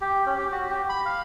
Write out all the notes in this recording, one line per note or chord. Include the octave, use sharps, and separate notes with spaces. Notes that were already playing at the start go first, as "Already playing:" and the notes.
G4
C#4
G4
F#4
G4
B5
F5